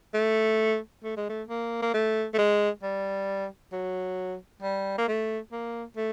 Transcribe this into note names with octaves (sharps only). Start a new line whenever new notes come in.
A3
A3
G#3
A3
A#3
A#3
A3
A3
G#3
G3
F#3
G3
A#3
A3
A#3
A3